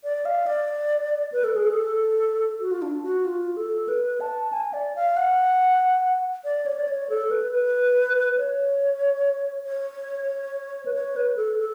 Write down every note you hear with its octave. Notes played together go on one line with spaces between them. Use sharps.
D5
F5
D5
B4
A4
G#4
A4
F#4
F4
D4
F#4
F4
A4
B4
A5
G#5
D5
F5
F#5
D5
C#5
D5
C#5
A4
B4
B4
C#5
C#5
B4
C#5
B4
A4
A4